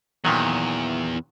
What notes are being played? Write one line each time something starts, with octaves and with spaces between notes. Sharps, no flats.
E2 A#2 D#3 F#3